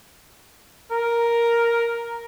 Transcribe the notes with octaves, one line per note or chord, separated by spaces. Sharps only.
A#4